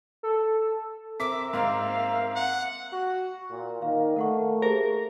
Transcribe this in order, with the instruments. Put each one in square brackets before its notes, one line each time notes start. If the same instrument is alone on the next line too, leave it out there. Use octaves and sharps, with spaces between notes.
[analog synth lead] A4
[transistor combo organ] C4 A#4 E5 [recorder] D6 [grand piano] B6
[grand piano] G#2 A#3 [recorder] F5
[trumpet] F#5
[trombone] F#4
A#2
[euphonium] D#3 [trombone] A#3 [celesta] F5
[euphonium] A3 [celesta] A#4 F#5 C#6
[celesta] G4 G#4 C5 [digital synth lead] A#4